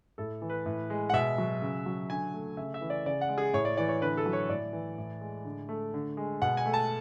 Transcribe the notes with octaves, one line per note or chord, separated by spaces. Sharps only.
A2 A4
E3
B4
A2
G#3
F#5
B2 E5
F#3
C#3
F#3
D3 G#5
A3
C#3 E5
E5
E3
D5
C#3 D5
F#5
G#3
G#4
A2 C#5
D5
E3 D5
C#5
D3 B4
A4
F#3
C#5
A2 D5
E3
A2
G#3
D3
A3
D3
G#3
B2 F#5
G#5
A3
A5